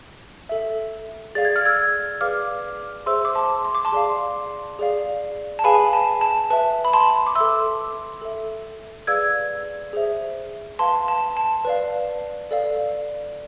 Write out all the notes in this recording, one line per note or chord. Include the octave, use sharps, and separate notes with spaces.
A4 E5
G#4 D5 F5 A6
G#6
F6
E6 G#6
G#4 B4 D5 F5 D6 F6
G#4 C5 E5 C6 E6
D6
A5 C6
C6
D6
A5 C6
G#4 D5 F5
G#4 D5 F5
A5
G#4 B4 F5 G#5 B5
A5
A5
B4 E5 A5
B5
A5 C6
D6
A4 E5 C6 E6
A4 E5
G#4 B4 D5 F5 E6 G#6
G#4 C5 E5
B4 F5 A5 C6
A5
A5
B4 D5 F5
A4 D5 F5